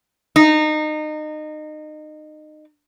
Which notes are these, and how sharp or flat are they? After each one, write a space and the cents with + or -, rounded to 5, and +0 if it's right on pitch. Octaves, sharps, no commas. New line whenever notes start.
D#4 -25